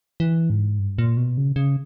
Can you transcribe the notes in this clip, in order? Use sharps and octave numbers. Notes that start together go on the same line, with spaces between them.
E3
G#2
G2
A#2
B2
C#3
C#3